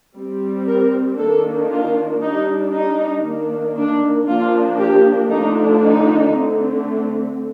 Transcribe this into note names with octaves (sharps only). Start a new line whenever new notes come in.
G3 C4
A#4
D#3 A#3 D4 A4
F4
G3 D4 D#4
D#4
D#3 A#3 D4
D4
F3 A#3 D4 F4
G4
D3 F3 A3 D4 D#4
D#4
D3 A3 C4